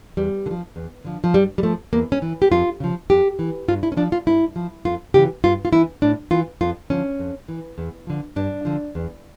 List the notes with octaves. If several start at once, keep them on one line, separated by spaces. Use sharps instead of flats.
E2 G3
D3
F3
E2
D3 F3
F3
G2 G3
G3
F3 A3
E2 A#3
C#4
E3
G4
F2 F4
C#3 F3
F2 G4
E3
G2 F4
E4
C#4
F3 D4
F4
G2 E4
F3
F2 F4
C#3 E3 G4
G2 F4
F4
E3 E4
A2 D4
E3 F4
F2 F4
D3 F3 C#4
F2
E3
E2
D3 F3
G2 D4
D3 F3
E2